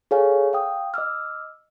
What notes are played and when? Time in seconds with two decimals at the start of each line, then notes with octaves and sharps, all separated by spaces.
0.11 G#4 A4 C#5 F5 G#5
0.53 F5 G5 D#6
0.94 D#5 D6 E6 F6